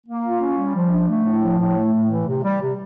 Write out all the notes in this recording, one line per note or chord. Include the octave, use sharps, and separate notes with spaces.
A#3
F4
C#4
G3
F3
D4
A3
A2
F3
A2
A3
A2
E3
C3
G3
C3